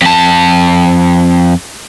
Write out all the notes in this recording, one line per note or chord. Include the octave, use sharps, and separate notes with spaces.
F2 A5